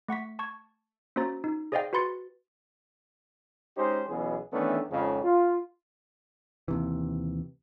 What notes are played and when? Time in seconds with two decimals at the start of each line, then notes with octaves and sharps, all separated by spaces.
0.08 A3 F#5 C#6 B6
0.39 A5 C#6 G#6
1.16 A#3 C#4 F#4 C5 A#5 A6
1.44 D#4
1.72 G#4 C5 D5 D#5 F5 G5
1.93 F#4 B4 B5 C6 A6 C#7
3.77 G#3 C#4 D#4 G4 C5
4.09 B1 B2 E3 C#4 E4 G#4
4.53 D#3 E3 A3 B3 C#4 D4
4.91 F2 G#2 C#3
5.24 F4
6.68 D#2 C3 E3